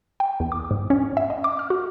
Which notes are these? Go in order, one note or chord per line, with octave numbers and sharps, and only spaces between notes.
G5
E2
D6
G#2
C#4
E5
D#5
D6
F6
F#4